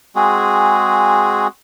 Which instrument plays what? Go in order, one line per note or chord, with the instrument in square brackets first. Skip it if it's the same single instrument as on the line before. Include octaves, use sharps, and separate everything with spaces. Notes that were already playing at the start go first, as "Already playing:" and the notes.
[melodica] G#3 C4 F#4 G#4